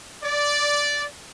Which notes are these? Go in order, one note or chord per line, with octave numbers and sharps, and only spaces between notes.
D5